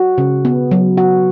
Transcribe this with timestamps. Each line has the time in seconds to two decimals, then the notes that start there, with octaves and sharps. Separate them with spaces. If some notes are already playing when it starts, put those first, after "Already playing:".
Already playing: F#4
0.18 C#3
0.45 B3
0.71 F#3
0.97 F#4